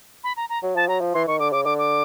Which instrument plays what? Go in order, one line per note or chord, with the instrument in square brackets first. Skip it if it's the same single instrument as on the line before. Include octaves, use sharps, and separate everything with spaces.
[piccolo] B5
A#5
A#5
[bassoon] F#3
[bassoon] F3 [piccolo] A5
[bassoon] F#3 [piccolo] A#5
[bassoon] F3
[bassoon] E3 [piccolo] C6
[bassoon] D#3 [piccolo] C#6
[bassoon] D3 [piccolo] D6
[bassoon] C#3 [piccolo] D6
[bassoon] D3 [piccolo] D6
[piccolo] D6